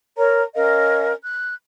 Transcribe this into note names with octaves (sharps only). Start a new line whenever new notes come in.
A#4 C#5 A#5
C#4 A#4 D#5 F5
F#6